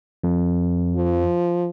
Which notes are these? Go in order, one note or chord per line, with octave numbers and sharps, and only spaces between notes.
F2
F3